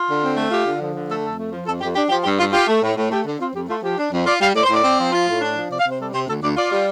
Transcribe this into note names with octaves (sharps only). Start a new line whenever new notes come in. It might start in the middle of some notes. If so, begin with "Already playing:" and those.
Already playing: F4
D3
C4
A3
F4 G4
D3
F3
D3
A3 A4
F2 A4
A3
F3
F2 A4
F2 G4
D4 G4
F3 G4
G2 G4
G2 F4
F4 G4
A3
A2
A2
A3 G4
D3
C4 F4
F2 G4
A3 F4
F3 G4
D4
F2
F4 D5
G3 F5
A2 D5
C5
A2 D5
C4
F3
F4
A2
D4
F3
C3 D5
F5
C3
C5
G3 A4
C3 C5
D2 A4
D2 D5
F4 D5
G3